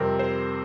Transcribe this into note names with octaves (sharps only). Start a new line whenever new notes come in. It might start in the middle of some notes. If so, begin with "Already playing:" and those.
Already playing: F2 C3 G3 C4 A#4
C5